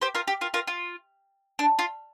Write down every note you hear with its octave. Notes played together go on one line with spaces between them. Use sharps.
G4 C5
F4 A#4
G4
F4 A#4
F4 A#4
F4
D4
F4